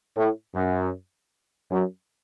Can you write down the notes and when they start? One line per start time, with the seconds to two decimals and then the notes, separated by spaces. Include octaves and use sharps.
0.17 A2
0.54 F#2
1.71 F#2